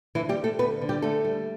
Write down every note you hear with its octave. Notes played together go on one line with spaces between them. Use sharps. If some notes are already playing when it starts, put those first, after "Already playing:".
D2 E3 E4
G3 G4
D2
A3 A4
D2 B3 B4
D3
G3 G4
D2 A3 A4
G3